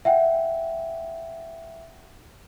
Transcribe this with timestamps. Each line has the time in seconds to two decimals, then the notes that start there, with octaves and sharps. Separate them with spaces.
0.05 E5 F#5 G5